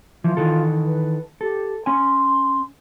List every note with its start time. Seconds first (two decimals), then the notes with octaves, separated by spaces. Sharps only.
0.24 E3 F3 F4
0.37 D#3 E3 A4
0.85 B4
1.41 G4 A4
1.86 C#4 G#5 C6